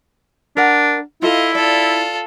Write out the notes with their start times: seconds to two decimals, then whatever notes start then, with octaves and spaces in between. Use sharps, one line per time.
0.57 D4 A#4 F#5
1.22 E4 F4 A4 D#5 F5
1.55 F4 A4 D5